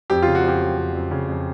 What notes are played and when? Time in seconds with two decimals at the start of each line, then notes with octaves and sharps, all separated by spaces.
0.10 F2 G4
0.22 C#3 F4
0.35 F#4
0.44 F2 G4
0.61 F#3
0.77 F2
0.95 F2
1.11 C#3
1.28 F2